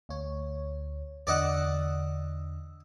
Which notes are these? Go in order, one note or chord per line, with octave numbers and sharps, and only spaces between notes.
D2 C#5
E2 D3 D5 D#5 F#5 E6